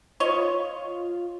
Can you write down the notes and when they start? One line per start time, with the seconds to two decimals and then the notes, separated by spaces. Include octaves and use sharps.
0.20 F4 C#5 D#5